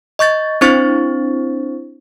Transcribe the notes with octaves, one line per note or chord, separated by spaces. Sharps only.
D#5 C#6 G6 A6
C4 D4 E4 C5 C#6 A6